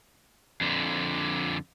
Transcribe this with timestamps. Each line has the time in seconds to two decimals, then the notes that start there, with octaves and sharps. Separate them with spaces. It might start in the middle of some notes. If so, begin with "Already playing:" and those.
0.61 F2 D3